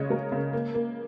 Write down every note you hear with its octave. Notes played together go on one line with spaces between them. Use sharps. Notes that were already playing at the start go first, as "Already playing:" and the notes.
Already playing: C#3 G#3 C#5 D#5
G#3 A#4
C#3
A#3
A#3